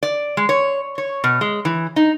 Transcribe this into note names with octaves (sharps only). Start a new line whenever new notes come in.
D5
G#3
C#5
C#5
B2
G#3
E3
D#4